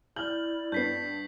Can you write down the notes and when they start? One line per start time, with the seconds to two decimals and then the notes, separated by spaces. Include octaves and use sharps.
0.16 E4 D5 F6 G6 F#7
0.72 G2 B3 G6 B6 C7